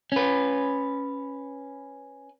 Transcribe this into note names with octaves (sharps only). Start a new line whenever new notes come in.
C#4 B4